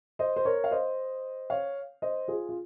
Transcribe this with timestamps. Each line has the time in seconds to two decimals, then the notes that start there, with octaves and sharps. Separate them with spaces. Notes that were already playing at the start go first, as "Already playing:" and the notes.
0.19 C5 D#5
0.36 C5
0.45 A#4 C#5
0.64 F5
0.71 C5 D#5
1.50 C#5 F5
2.02 C5 D#5
2.28 F4 G#4
2.49 F4